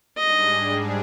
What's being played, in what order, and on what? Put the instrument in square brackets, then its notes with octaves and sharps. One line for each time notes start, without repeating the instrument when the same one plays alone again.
[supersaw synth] G#2 G3 D4 G#4 [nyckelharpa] D#5